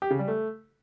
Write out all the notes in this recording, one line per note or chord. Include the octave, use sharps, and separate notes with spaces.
G4
C#3
G3
A3